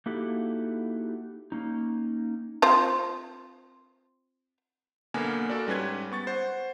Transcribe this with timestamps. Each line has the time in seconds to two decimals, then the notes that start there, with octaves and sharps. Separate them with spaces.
0.06 A#3 D#4 E4 F#4 G4 A4
1.52 A#3 C#4 D#4
2.62 C4 F4 C5
5.14 B1 D3 A#3 B3 A#4 G#5
5.49 F#4 A4 A#4 D5
5.67 G#2 G3 C#4 B4 G#6
6.12 B3 C#6 A6
6.27 C5 F#5